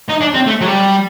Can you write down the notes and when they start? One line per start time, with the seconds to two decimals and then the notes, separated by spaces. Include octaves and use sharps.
0.09 D#4
0.21 D4
0.34 C4
0.46 A3
0.61 F#3
0.66 G3